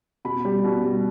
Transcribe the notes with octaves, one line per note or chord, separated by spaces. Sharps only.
B2 B5
G3
B2
G3